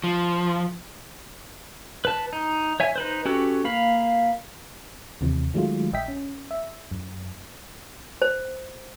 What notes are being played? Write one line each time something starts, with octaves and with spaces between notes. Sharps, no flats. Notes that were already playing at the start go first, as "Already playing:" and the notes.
F3
B4 A5
D#4
C#5 E5 G#5
D#4 B4 C5
C#4 F#4 G4 A4 B4
A#3 F5 B5
D#2 C3 E3
D#3 F#3 G#3 A3 F4
A#1 D#5 E5 G5 B6
C#4
E5
F#2
C5